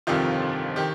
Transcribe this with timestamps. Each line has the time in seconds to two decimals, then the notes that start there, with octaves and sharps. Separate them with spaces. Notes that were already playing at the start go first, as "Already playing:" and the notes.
0.07 G1 F2 C3 D#3 F4
0.76 D#3 G4